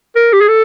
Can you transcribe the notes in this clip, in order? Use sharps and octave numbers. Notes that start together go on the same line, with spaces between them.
A#4
G4
G#4
A4